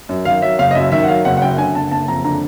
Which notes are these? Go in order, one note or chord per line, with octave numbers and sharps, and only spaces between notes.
F#2
D#3 F5
F#3 E5
F#1 F5
D#5
F#2 E5
D#3 E5
F#5
F#3 F5
F#1 F#5
F#5
F#2 G5
D3 G#5
F#1 A5
F#1 A5
F2 A#5
D3 A#5